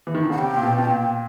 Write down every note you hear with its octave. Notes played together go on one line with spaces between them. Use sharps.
E3
D#3
D3
C#3 F#5
C3 G5
A#2
B2
B2
A#2